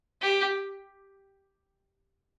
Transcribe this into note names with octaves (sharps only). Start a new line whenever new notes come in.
G4